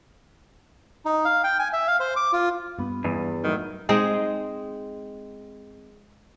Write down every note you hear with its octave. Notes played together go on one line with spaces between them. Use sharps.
D#4
F5
G5
G#5
E5
F5
C5
D6
F4
G2 B3
E2 G2
A2 D#3 F#3
G#3 C4 D#4 G#4